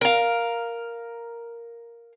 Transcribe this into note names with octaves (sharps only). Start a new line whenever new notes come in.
A#4 F5